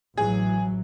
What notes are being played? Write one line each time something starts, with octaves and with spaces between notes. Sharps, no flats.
A1 E3 F#3 G#4